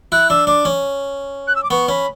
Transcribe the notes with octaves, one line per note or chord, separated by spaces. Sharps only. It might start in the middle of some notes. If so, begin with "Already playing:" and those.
E4 F#6
D4 E6
D4 D6
C#4
F#6
E6
D6
B3 C#6
C#4 B5